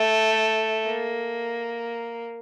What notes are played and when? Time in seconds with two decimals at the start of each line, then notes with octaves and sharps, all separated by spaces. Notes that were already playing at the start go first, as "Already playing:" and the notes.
Already playing: A3
0.85 A#3